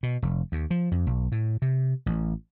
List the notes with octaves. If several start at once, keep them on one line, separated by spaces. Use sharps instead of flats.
B2
F1
D#2
F3
F2
B1
A2
C3
A1